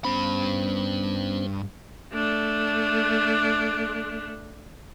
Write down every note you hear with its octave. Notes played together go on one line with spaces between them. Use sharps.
G2 B3 C#4 C5 B5
A3 D4